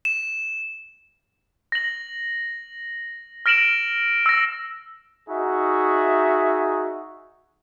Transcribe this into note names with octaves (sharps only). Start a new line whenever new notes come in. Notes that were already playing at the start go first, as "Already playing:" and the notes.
E7
A#6 F#7
F6 A#6 D7 E7 F#7
E6 A#6
D#4 F#4 G#4 E5